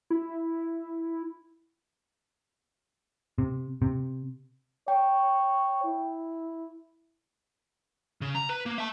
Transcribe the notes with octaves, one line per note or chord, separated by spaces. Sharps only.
E4
C3
C3
C#5 G5
E4
C#3
A#5
B4
A#3
E5 A5